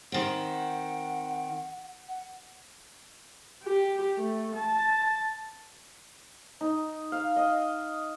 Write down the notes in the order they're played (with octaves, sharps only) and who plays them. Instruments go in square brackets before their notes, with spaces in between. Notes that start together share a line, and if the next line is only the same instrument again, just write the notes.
[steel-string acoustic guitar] D#3 C4 [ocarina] F#5
[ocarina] F#5
[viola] G4
A3
A5
[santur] D#4
F5
D#5